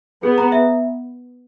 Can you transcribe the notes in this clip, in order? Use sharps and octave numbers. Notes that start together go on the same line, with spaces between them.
B3 G#4
A#5
E5